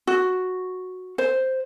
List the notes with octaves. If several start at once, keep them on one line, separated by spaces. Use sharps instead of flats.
F#4
C5